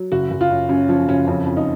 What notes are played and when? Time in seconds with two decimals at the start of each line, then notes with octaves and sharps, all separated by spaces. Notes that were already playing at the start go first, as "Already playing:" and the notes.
Already playing: F#3
0.12 F#1 F#4
0.31 F#1
0.41 F4
0.50 F#2
0.69 F#2 C#4
0.89 F3 C#4
1.08 F#1 C#4
1.27 F2 C#4
1.46 F2
1.57 D#4